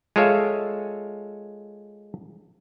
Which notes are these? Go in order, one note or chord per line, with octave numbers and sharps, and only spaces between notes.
G#3 F4 A4 C#5 E5 F5